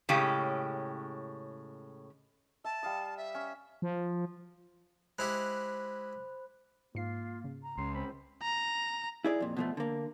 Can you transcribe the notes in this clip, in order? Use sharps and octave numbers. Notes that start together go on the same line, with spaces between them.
A2 C#3 G#3 C#4 G4
E5 A5
G3 F5 D#6
E5
C#4
F3
G#3 E4 G4 C5 B5 F#6
G#2 A#3 F4 C7
C#3
A#5
C#2 C6
C4 B5
A#5
E4 G#4 D5
F2 A#2
B2 F3 A3
D3 A#3